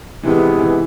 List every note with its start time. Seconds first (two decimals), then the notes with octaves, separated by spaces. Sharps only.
0.23 C3 D#3 E3 G#3 B3
0.59 E3